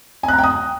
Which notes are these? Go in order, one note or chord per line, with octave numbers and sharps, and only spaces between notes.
G#5
F#6
A#5
G5
D#6